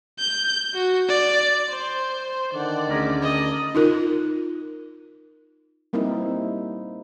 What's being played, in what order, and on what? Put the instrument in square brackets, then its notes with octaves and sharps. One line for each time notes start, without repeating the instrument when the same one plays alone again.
[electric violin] G6
F#4
D5
C5
[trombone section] D3 D#3 [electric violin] D5 [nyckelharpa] F#5
[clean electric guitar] D2 C#4 A#4 [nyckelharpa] A3 G#4
[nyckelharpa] D#5
[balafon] D#4 F4 A#4
[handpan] G3 A#3 C4 D#4 E4